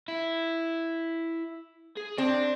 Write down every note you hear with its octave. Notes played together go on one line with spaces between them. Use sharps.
E4
G#4
C4 D5 A5